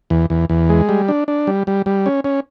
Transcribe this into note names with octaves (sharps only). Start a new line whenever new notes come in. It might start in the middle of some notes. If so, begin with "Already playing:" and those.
E2
E2
E2
G#3
G3
D4
D4
G3
G3
G3
C#4
C#4